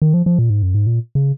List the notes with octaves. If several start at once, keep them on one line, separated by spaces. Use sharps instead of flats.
D#3
F3
F3
A#2
G#2
F#2
G#2
A#2
C#3